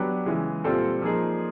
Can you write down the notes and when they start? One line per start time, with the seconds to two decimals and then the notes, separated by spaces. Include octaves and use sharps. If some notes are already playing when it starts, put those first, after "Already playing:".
Already playing: F#3 B3 D4 G4 B4
0.26 C#3 E3 G#3
0.64 A#2 G3 C4 F4 A4
1.02 F3 A#3 D#4 G#4